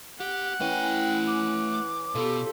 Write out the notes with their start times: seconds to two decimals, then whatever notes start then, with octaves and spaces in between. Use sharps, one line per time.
0.20 G4 F#5
0.60 E3 A3 C#4 G5 G#5
1.27 D6
2.15 B2 B3 F4 G4 A4